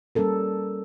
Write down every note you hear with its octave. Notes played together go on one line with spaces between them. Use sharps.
G3 A#3 C#4 A4 A#4